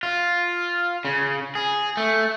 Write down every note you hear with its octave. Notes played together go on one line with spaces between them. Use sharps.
F4
C#3
G#4
A3